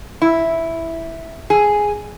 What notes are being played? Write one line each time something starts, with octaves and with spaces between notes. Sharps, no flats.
E4
G#4